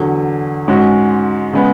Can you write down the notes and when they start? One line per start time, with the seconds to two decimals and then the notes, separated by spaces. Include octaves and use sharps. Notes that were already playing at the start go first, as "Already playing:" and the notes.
Already playing: E2 D3 F#3
0.68 G#2 G#3 C#4 F#4
1.53 C#3 G#3 B3